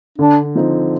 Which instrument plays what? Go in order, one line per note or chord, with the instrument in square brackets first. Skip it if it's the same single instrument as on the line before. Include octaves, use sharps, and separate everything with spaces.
[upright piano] D3 [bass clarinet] D4
[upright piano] F3 C4 D#4 A4